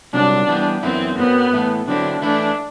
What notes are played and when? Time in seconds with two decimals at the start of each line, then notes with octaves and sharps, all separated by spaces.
0.13 C2 C3 F#3 D4
0.49 E3 G3 B3
0.83 F#2 E3 B3 C4 E4
1.18 F#2 F#3 B3 C4
1.53 A2 E3 A3 E4 A4
1.87 D3 F#3 C4 D4 E4
2.22 E3 A3 D4 E4